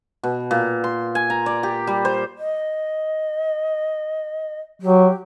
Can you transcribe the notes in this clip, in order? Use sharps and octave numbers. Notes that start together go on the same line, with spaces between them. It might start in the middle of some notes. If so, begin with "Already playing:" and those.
B2
A#2
C6
G#5
A#5
D5
G4
G3
C5
D#5
F#3 G4